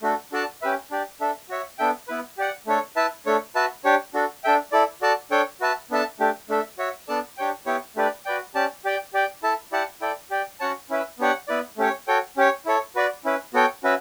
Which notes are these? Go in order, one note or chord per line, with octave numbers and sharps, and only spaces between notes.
A3 D4 F#4 A4
D4 F#4 A4 D5 A5
C#4 G4 B4 E5
D4 G4 D5
D4 A4 E5
F#4 C#5 E5
B3 D4 A4 E5 G5
B3 E4 B4
G4 D5 F#5
A3 D4 A4 C#5
E4 B4 E5 A5
A3 D4 A4 C#5
F#4 B4 E5 A5
D4 G4 C#5
D4 F#4 A4
D4 A4 E5 G5
E4 A4 D5
F#4 A4 D5 A5
D4 A4 C#5 G5
F#4 B4 E5 A5
B3 D4 A4 E5 A5
A3 D4 G4
A3 D4 A4 E5
F#4 C#5 E5
B3 D4 A4 D5 A5
D4 G4 C#5 G5
B3 E4 G4 C#5
A3 D4 G4 B4 D5
F#4 B4 D5 G5
C#4 G4 D5 A5
G4 D5 G5
G4 D5 G5
E4 A4 E5 A5
E4 G4 D5 F#5 A5
E4 A4 D5 G5
G4 D5 G5
C#4 F#4 C#5 F#5 A5
C#4 E4 B4 E5
B3 D4 G4 C#5 F#5
B3 E4 B4 D5
A3 C#4 G4 C#5
F#4 A4 C#5 G5
C#4 G4 C#5
E4 A4 C#5
F#4 B4 D5
C#4 E4 B4
B3 F#4 A4 C#5 G5
C#4 F#4 B4 E5